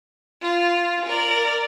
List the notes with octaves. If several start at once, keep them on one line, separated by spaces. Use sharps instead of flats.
F4
A#4 D5